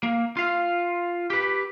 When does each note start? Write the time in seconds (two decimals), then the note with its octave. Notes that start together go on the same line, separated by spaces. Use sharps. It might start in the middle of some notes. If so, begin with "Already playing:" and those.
0.03 A#3
0.37 F4 F5
1.30 G4 B4